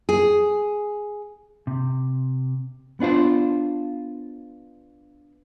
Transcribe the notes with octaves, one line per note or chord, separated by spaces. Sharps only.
G#4
C3
B3 D4 F4 C5